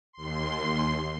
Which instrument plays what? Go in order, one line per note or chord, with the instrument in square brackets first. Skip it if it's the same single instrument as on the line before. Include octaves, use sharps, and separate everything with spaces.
[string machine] D#2 C6